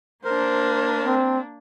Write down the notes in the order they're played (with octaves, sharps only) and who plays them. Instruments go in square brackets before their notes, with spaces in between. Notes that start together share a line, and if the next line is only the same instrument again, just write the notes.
[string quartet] A#3 D4 [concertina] A#4 [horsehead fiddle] C5
[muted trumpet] C4